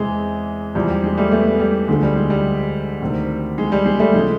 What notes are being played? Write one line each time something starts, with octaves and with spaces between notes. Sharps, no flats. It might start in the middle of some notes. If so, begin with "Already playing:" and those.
Already playing: E2 C3 E3 G#3
E2 C3 F3 G3
G3
G#3
G3 A3
A3 B3
G3
D2 D3 F3 G#3
G3
G#3
G3
D2 C3 D#3
G#3
G3
G#3
G3 A3
C#3 F3 G#3